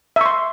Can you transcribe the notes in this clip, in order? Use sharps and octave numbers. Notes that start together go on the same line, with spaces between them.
E5 C6 C#6